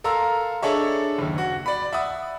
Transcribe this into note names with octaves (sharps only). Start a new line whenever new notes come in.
A4 A#4 F5 A#5 C6 E6
D4 G#4 A4 C#5 D#5 E5
F#1 D#2
F#4
D5 B5
E5 F#5 D#6